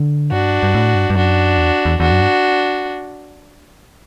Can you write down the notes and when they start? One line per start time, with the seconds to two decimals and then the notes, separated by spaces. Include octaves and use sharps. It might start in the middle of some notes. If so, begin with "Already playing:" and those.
Already playing: D3
0.32 G2 D4 F#4
0.63 G2
0.74 A2
0.95 G2
1.10 G2
1.16 F#2 D4 F#4
1.58 E2
1.85 E2
2.00 E2 D4 F#4
2.11 F#2
2.22 G2